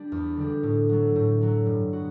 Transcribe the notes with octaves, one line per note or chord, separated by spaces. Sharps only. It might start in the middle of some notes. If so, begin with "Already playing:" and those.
Already playing: G3 D4
E2
D3 G3 D4
A2
F#3 A3
A2
F#3 A3
G2
B3 F#4